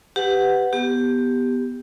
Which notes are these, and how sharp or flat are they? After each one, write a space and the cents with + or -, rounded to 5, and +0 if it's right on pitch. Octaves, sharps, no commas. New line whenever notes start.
G4 +0 B4 +15 F#5 +0
B3 +0 G4 +5